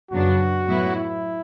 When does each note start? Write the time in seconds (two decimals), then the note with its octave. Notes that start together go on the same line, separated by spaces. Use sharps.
0.11 F#2 C#3 F#3 B3 D4 F#4
0.68 A2 F#3 B3 E4
0.96 E4